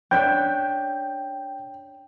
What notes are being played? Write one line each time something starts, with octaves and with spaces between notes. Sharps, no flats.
C#4 D4 E5 G5 G6